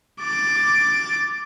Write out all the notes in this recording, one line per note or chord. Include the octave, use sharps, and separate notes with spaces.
D6 A6